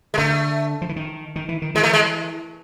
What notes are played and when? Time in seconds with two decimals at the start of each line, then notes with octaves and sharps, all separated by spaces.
0.14 G#3
0.18 D3 A3
0.82 F3
0.89 E3
0.96 D#3
1.36 D#3
1.49 E3
1.62 D#3
1.75 E3 G#3
1.83 A3
1.93 G#3